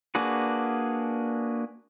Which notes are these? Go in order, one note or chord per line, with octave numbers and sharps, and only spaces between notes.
A#3 D4 F#4 G#4 B4